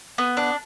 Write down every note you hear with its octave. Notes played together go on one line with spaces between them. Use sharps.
B3
D4